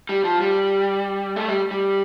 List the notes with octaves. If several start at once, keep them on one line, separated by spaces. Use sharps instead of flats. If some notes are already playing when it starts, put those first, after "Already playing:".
G3
F3
G3
A3
G3
G3